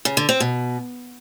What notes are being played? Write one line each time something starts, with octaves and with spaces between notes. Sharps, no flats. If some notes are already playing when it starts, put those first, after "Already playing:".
C#3
D3
C4
B2